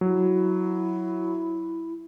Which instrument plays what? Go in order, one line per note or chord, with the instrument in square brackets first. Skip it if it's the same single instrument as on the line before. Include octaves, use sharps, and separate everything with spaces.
[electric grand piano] F#3 [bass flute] E4